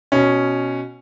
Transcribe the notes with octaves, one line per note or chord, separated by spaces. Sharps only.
B2 C#4